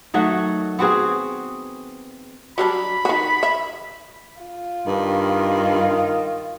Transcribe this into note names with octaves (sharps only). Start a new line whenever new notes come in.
D#3 F#3 A3 F#4
B3 C4 F#4 G#4
F#3 G3 D4 B5
D#3 F#4
E5
F4
G2 D#3